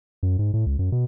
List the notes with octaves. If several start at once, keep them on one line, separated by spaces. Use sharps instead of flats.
F#2
G#2
A2
C#2
F#2
B2